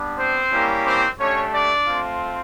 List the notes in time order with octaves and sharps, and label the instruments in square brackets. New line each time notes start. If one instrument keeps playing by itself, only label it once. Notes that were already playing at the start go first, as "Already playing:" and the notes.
Already playing: [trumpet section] G3 B3 D4
C4 C5
G3 A#3 C#4 E4 G4
C4 C5
A3 C#4 D4 G4 C#5
D4 D5
A3 C4 F4